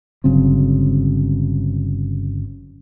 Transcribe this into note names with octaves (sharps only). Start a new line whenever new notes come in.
G1 C#3 F#3 C4